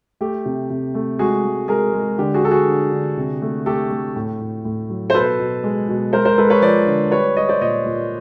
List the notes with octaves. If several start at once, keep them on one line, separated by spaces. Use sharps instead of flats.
A3 G4
C3
C3
A3
G#3 F#4 G#4
G#3
G#3 G#4 A#4
G#3
D3 G4
F#4 G#4
D3 A4
F#4 G#4
D3
D3
C3
A3
A3 G4 A4
A3
A2
A2
A2
F#3
C5
B2 A4 B4
B2
G#3
B2
G#3 A#4 C5
A#4 C5
G#3 A4 B4
B4 C#5
F3 C5 D5
D3
G3 B4 C#5
G3 C#5 D#5
C5 D5
A#2 C#5 D#5
A#2